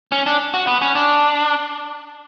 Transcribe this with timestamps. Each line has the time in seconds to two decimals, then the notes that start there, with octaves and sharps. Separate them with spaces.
0.12 C#4
0.26 D4
0.54 F#4
0.67 B3
0.82 C#4
0.95 D4